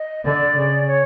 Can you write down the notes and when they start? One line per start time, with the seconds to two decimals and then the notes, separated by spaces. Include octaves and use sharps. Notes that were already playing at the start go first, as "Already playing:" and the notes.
Already playing: D#5
0.25 D3 D5
0.56 C#3
0.88 C#5